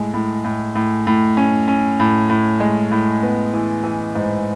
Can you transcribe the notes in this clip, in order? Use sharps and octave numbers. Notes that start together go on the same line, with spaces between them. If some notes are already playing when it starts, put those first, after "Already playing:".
Already playing: A2 G#3
A2
A2
A2
A2
C#4
C#4
A2
A2
G#3
A2
B3
E3
E3
G#2